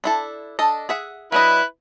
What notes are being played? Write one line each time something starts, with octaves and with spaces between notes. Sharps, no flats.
D4 E4 A4
D4 A4 D#5
G#4 E5 F#5
F#3 D4 E4 B4 D#5